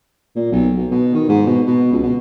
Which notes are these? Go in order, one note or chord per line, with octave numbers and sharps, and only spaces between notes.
A#2
B1
B1
B2
D#3
G#2
B2
B2
C#2
B2